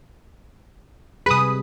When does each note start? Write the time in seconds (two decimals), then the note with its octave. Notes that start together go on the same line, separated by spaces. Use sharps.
1.26 C3 G3 G#4 B4 D#6